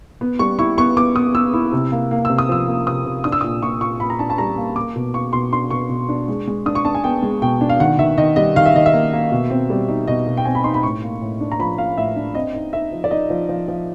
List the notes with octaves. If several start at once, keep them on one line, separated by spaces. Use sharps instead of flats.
B3
G3 C#6
E4 C#6
B3 C#6
B3 D6
B3 D#6
B3 E6
E4
C3
A#3
A#3
C3 E6
D#6
F3 E6
A#3
C3 D#6
C3
D4 D#6
E6
A#2 D#6
A#2 C#6
A#2 C#6
A#2 B5
A#5
D4 A5
A5
G3 A#5
A#3
A#3 D6
B2
A#3 C#6
B2 C6
D4 C6
B2 C#6
B2
D4
G#3
G#3
D4 D#6
C#6
D4 A5
G#5
B3 G5
G#3
B2 G5
D4
F5
D#3 F#5
D#3 E5
D#3 D#5
G3 D#5
D#3 F5
E5
D#3 D#5
E5
A#3
A#3
B2
C4
G3
D#4
B2 D#5
B2
G5
C4 G#5
B5
D#4 C6
B5
A2 C#6
A#3
A2
D4
A#5
F3 B5
A#3 F5
A2 E5
D4
C4 D#5
D#4
D#4 E5
F3
D5
D#4 D#5
F3
F3
F3